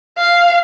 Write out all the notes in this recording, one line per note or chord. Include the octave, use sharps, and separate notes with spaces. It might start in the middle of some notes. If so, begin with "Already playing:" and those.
F5